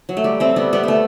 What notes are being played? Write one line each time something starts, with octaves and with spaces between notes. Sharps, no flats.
F#3
A3
G3
A3 C4
G3 B3
G3 B3
A3 B3